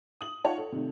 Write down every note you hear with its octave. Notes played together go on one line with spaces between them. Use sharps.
D#6 F#7
D#4 F4 C#5 F#5 A5
A4
C3 D#3 A3